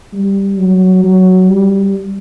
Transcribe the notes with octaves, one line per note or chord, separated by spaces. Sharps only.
G3
F#3
F#3
G3